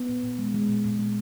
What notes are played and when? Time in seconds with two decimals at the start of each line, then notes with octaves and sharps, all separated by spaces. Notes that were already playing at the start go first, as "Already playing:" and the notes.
Already playing: B3
0.09 A#2
0.24 A#2
0.39 G#3
0.54 G#3
0.69 A#2
0.84 A#2
0.99 G#3